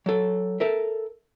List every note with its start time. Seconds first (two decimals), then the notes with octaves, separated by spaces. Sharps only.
0.06 F#3 A4
0.60 A4 A#4 E5